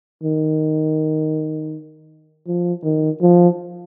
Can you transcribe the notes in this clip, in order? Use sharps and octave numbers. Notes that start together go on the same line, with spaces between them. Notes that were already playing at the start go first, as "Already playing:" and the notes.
D#3
F3
D#3
F3